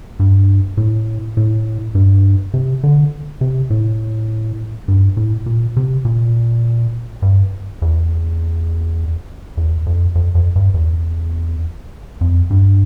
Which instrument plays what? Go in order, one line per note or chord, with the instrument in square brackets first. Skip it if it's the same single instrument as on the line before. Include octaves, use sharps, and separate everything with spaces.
[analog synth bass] G2
A2
A2
G2
C3
D3
C3
A2
G2
A2
A#2
C3
A#2
G2
E2
E2
F2
F2
F2
G2
E2
F2
G2